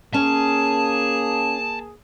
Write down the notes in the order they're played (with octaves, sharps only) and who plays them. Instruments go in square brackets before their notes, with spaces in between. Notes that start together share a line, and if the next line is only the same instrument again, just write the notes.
[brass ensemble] A#3 G#4 [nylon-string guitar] C#4 [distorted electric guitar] A5